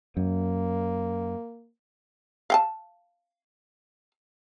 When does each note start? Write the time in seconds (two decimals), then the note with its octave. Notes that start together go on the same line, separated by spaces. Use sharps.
0.17 F#2 A#3
2.50 F5 G5 A5